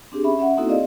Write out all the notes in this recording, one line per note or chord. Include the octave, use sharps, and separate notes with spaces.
C4 D4 G4 G#4
C#4 E5 B5
C#4 E5 F#5
A#3 C4 D#4 E4 F#4 A4
C4 G#4 D5 D#5 F5